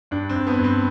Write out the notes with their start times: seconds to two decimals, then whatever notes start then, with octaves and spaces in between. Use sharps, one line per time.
0.11 G2 D4
0.29 C4
0.35 G2
0.47 B3
0.58 G2
0.64 C4